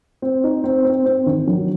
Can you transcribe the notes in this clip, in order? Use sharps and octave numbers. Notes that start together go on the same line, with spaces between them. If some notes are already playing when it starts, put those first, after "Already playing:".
C4
D#4
C4
C4
C4
D#3
F#3